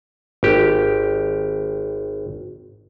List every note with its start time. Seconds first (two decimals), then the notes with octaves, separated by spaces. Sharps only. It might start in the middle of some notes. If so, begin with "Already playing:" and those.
0.43 G#1 G4